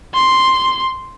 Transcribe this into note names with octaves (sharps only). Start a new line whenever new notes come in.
C6